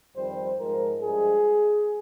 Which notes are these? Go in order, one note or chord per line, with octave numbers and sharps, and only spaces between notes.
F2 D#3 G3 C5
G#2 F3 G#3 A#4
G2 F3 G#3 G#4